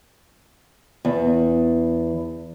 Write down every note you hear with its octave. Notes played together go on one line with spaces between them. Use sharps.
E2